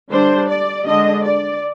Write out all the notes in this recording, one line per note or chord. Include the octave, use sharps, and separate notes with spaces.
D3 G3 D4 C5
D5
D3 G#3 D4 D#5
D5